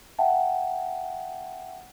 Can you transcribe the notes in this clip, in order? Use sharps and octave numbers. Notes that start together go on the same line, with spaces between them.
E5 F#5 G5 A5